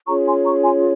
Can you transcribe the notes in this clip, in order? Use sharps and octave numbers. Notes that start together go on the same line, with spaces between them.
C#4 F4 G#4 C#5 A#5 C#6
G#5 C6
A#5 C#6
G#5 C6